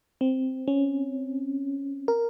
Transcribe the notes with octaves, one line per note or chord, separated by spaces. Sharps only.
C4
C#4
A#4